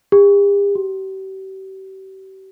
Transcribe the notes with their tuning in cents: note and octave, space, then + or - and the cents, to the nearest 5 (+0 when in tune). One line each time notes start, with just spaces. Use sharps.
G4 +45
G4 -40